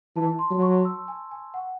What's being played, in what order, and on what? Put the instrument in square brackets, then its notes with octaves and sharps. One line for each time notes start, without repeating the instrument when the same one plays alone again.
[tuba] E3 [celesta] A5
[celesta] C6
[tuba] F#3
[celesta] C#6
E6
G#5
G#5
F#5